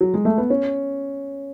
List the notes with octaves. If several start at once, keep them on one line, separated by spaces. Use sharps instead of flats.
F#3
G#3
A3
B3
C#4